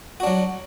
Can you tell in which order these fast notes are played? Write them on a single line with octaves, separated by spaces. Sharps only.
F#4 D4 F#3